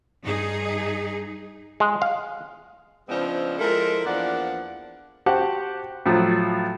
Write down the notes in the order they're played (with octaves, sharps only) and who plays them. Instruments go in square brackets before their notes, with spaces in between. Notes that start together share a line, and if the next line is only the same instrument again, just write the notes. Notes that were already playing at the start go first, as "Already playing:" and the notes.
[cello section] G2 D#4 G#4
[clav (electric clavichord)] G#3
F5
[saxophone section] C#3 F3 G#3 B3 C4 D4
F3 G#3 E4 A4 A#4
E2 F3 A#3 D4 D5 F#5
[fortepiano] F#4 G4 C5 F#5 A5
A2 F3 F#3